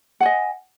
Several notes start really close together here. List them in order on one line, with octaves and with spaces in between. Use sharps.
F#5 G#5 D#5